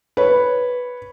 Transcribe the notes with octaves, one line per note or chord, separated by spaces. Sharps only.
B4 C#5